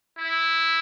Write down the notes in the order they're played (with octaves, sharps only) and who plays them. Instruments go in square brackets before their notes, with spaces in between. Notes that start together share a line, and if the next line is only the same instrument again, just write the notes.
[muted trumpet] E4